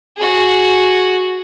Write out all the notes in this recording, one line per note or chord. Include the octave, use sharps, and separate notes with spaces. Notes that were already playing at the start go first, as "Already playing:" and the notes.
F#4 G#4